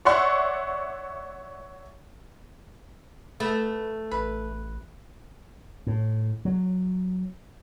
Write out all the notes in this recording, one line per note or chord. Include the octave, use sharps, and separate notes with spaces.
C#5 D5 E5 F#5 C6 C#6
A3 B3
A1 B4
A2
F#3